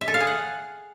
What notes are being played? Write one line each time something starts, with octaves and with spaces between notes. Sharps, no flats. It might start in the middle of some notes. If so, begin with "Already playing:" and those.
E5
A4
F5
G#4
F#5